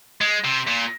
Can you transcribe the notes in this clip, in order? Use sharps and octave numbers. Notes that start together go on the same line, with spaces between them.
G#3
C3
A#2